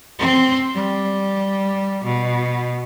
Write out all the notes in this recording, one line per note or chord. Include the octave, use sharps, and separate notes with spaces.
C4
G3
B2